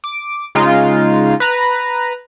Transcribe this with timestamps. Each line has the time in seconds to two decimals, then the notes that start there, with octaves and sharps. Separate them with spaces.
0.04 D6
0.55 C#3 G#3 D#4 F4
1.40 B4 A#5